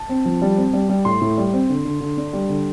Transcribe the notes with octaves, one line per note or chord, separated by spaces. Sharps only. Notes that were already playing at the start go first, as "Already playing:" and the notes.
Already playing: A5
C4
F3
G3
C4
G3
G3
A2 C6
A2
G3
C4
D3
D3
D3
D4
G3
D3